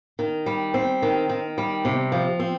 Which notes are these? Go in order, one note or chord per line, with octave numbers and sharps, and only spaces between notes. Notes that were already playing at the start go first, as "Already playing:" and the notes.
D#3
G3
C4
D#3
D#3
G3
C3
F3
C4